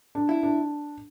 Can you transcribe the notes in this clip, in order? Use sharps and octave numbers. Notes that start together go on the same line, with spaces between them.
D4
E4
D4